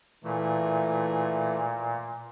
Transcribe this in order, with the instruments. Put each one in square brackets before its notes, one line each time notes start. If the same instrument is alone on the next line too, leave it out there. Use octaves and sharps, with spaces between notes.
[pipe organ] A#2 [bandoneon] E3 A3